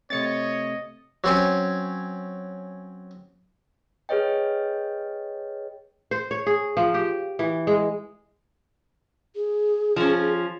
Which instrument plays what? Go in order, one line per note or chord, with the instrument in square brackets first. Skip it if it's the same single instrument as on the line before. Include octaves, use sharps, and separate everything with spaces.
[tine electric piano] C3 A3 C4 [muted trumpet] C#5 [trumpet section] D#5 [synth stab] A6 C#7
[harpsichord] F#3 C4 C#4
[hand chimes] G#4 B4 C#5 D#5 G5
[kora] C5
C#5
G#4
F3
G4
E3
G#3
[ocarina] G#4
[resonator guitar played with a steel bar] F3 C#4